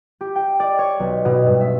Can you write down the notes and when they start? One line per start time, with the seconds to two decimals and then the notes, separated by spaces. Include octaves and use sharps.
0.21 G4
0.36 G5
0.60 D5
0.79 C#5
1.00 B1
1.25 B2
1.47 G2
1.61 E5